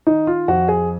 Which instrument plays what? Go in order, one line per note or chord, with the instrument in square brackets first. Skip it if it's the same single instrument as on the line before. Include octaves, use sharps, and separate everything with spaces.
[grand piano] D#3 D#4
F4
F2 F#4
G#4